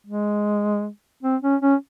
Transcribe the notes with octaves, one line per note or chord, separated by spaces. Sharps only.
G#3
C4
C#4
C#4